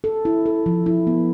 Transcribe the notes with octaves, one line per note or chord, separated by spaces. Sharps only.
A4
E4
A4
F3
E4
B3